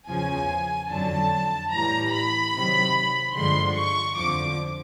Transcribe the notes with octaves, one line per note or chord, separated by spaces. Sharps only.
E2 C#3 F3 G#5
F2 D3 F#3 A5
A2 E3 G3 A#5
B5
C3 D#3 F#3
G2 D3 F3 G#3 C6
C#6
F2 D3 F3 D6